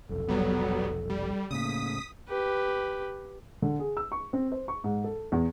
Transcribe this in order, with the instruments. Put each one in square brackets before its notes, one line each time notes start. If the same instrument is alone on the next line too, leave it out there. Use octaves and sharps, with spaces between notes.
[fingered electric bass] F1 B1 F2 [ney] A4
[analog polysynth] F#3 G3 B3
G3
[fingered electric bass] A2 C#3 [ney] A#3 [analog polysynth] D#6 B6
[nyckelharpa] G4 B4
[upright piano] D3
G#4
E6
C#6
C4
C5
C#6
G#2
A4
E2